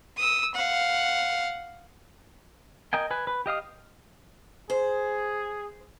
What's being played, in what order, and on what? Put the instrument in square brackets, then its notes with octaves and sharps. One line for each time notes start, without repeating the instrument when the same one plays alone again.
[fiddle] D#6 E6
F5 F#5
[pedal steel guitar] A#4 D#5 G5 G#5
B4 G#5
B4
G4 D#5 F5 D#6
[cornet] G#4 [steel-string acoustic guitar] C5